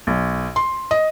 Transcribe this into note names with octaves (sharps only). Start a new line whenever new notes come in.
B1
C6
D#5